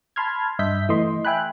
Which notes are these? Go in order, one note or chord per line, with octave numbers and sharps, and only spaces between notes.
A5 B5 C6 F6 G#6
G2 D#5 E5 G6 B6
E3 A3 D#5 C6
E5 G5 G#5 B5 F#6